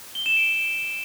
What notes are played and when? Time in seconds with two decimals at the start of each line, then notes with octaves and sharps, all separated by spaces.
0.15 G7
0.26 E7
0.37 D7